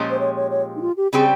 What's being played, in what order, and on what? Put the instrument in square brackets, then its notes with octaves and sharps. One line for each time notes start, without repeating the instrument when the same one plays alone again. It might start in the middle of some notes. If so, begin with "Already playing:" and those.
Already playing: [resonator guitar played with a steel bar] A#2 F3 G#3 C#4 G4
[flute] C5
C#5
C#5
C#5
D#4
F4
G4
[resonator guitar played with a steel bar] C#3 G3 C4 G4 C5 [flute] G#4